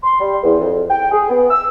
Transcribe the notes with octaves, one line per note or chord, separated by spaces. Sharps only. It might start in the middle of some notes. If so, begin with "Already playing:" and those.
C6
G3
E2
F2
G5
G#4
B3
E6